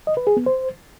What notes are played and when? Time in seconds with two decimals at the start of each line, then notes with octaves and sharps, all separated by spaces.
0.07 D#5
0.17 B4
0.27 G#4
0.37 B3
0.46 C5